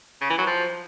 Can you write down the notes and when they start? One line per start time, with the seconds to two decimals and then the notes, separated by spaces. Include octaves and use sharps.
0.21 C#3
0.30 E3
0.38 F#3
0.47 F3